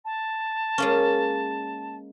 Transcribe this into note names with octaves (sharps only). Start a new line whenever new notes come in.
A5
G#3 A#3 C#4